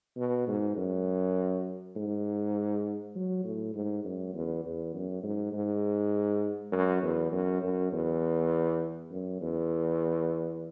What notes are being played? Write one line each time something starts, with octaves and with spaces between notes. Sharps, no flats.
B2
G#2
F#2
G#2
F#3
A2
G#2
F#2
E2
E2
F#2
G#2
G#2
F#2
E2
F#2
F#2
E2
F#2
E2